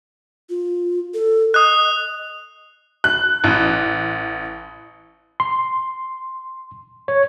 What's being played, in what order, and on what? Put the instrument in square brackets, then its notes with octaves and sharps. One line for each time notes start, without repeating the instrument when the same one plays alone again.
[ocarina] F4
A4
[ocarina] D#5 [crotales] D#6 F#6
[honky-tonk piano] F#6
A1
[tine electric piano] C6
C#5